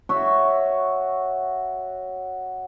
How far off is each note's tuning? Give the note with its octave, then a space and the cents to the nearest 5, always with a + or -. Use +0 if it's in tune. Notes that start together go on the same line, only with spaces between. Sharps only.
F#4 +0 C#5 +0 E5 +0